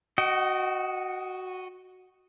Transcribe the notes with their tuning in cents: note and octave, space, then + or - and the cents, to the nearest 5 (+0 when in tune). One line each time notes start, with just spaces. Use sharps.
F#4 +0 D#5 +0 G5 -45